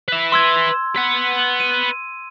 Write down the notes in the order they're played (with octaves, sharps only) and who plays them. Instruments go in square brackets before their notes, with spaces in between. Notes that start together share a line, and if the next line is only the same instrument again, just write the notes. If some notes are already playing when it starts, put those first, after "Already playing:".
[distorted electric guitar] B4 E5
[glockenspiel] C6 E6 G#6
[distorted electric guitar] B4 F#5
[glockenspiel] D#7